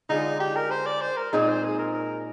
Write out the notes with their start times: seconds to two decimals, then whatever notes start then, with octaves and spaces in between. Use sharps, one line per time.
0.09 D3 G#3 D4 D#4 F4 G#4
0.40 G4
0.56 A#4
0.71 C5
0.87 D5
1.01 C5
1.17 A#4
1.33 A#2 G#3 C4 D#4 G#4
1.48 C5
1.64 G#4
1.79 A#4
1.94 A#4